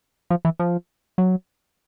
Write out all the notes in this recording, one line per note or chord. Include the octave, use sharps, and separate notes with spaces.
F3
E3
F3
F#3